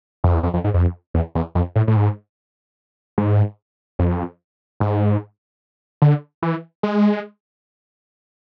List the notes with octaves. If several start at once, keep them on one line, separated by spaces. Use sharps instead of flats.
F2
E2
F2
F2
G#2
F2
E2
E2
F2
A2
A2
G#2
G#2
F2
G#2
D3
E3
G#3